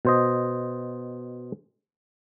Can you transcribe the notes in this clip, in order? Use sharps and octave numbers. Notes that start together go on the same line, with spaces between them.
B2 C5 D#5